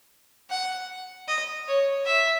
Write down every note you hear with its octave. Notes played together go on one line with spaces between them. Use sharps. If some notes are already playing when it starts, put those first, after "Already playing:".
F#5
D#5
C#5
E5